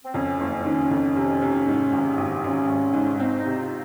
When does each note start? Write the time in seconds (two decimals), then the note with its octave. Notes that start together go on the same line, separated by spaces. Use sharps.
0.05 C4
0.14 F2 C#4
0.39 F#1 C#4
0.65 D#3 C#4
0.91 F2
1.16 C3
1.42 C3
1.67 G#2
1.93 G#1
2.17 G#1
2.44 G#1 C#4
2.69 G#1
2.94 G#2
3.19 C4 D#4
3.39 D#4
3.45 C3
3.58 F4